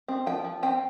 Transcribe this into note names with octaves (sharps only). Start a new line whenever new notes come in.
C4
F3 G5
F3
C4 G5